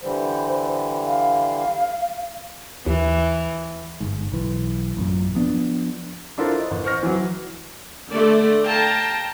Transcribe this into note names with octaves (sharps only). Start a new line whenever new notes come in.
D3 E3 G3 C5
F5
D#2 E3
G1 G#2
B1 E3
A1 F#2 A#2
F3 B3 D4
D4 E4 F4 A4 A#4 C5
D#5
A1
C5 C#6 F6 A#6
E3 F#3
D3 A3 A4 D5
F5 G5 A5 A#5